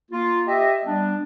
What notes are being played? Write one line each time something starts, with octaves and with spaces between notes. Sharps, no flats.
A#3 F4
G4 D#5 E5
G3 B3 D4